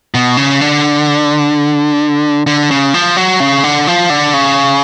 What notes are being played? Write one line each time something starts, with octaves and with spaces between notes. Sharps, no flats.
B2
C#3
D3
D3
C#3
F3
F#3
C#3
D3
F3
D3
C#3